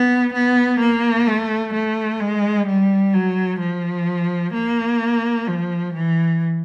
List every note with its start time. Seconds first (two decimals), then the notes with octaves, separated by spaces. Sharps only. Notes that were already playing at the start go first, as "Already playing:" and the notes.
Already playing: B3
0.33 B3
0.79 A#3
1.27 A3
1.74 A3
2.20 G#3
2.67 G3
3.14 F#3
3.60 F3
4.53 A#3
5.47 F3
5.94 E3